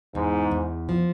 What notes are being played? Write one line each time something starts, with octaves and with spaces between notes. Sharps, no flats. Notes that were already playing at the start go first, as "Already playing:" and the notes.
E2 G#2
E2
F3